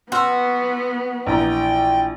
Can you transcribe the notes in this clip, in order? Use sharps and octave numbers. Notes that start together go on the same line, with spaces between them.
B3 F#4 C6 E6 F6
A#1 E3 G5 A#5